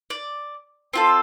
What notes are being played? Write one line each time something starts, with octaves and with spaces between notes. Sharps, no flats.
D5
C4 F4 A4